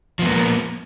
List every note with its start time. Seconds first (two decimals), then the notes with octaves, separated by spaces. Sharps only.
0.19 F3
0.22 B3
0.25 A#3